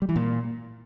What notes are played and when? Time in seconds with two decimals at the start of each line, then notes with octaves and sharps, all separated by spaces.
0.02 G3
0.09 E3
0.16 A#2